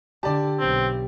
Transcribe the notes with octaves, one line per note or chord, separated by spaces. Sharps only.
D3 G4 D5 A5
B1 C4